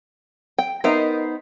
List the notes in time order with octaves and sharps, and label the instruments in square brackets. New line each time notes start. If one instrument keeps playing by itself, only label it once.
[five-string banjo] G5
[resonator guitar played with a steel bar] B3 D#4 C5 [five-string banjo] A#4 E5